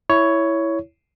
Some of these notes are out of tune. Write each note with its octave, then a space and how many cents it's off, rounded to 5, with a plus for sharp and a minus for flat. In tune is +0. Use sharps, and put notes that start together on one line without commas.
E4 +0 C#5 +10